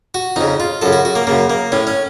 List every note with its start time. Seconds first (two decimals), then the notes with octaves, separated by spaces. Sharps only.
0.14 F#4
0.36 F2 C#3 D#4
0.60 F4
0.82 F#2 C#3 A4
0.93 F#4
1.05 F#4
1.15 A#3
1.27 F#2 C#3 A#3
1.50 A#3
1.72 A2 C#4
1.87 C#4